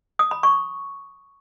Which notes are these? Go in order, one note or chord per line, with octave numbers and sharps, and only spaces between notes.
D#6
B5
C#6